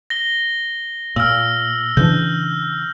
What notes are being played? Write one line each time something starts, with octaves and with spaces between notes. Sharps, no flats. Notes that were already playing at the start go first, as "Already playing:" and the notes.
A#6 G7
A#2 E6 F6
C#3 E3 D4 G6